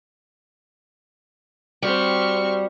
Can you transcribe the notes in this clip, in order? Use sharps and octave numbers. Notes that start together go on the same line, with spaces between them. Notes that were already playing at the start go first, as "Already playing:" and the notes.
G3 C4 F#4 G4 C#6 F6